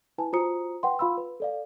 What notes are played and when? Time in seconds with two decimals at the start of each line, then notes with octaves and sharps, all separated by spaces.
0.18 E4 B4 G#5 A5
0.33 F4 F#4 C5 A#5 D#6 C#7
0.83 B4 F#5 G5 C6
0.99 F4 F5 B5 C6 E6
1.17 B4
1.40 A4 D5 F5